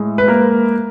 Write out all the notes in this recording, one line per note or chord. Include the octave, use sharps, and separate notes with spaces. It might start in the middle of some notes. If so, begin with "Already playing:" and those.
Already playing: A2 G#3
B4
A#3 A#4